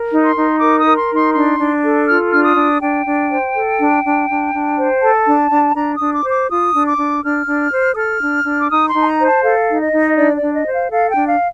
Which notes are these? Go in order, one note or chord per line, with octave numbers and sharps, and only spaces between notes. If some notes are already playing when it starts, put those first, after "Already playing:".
Already playing: A#4
D#4
C6
D#4
A#4 D6
D#6
A#4
C6
D#4
C6
D4 C6
D4
A4
F4 F6
D4 F6
D#6
D4
D4 G5
D4
C5
A4
D4
D4
D4
D4
C5
A4 A5
D4
D4
D4 A#5
D#6
D4
D6
C5
D6
F4 D#6
D4
D6
D4
D4 F6
D4
C5
D#6
A4 F6
D4
D4
D6
D#4 D#6
C6
D#4
A5
A#5
C5
A5
A4 F5
D#4
D#5
D#4
D4 D5
D5
D4
D#5
C5
F5
A4 F5
G5
D4
F5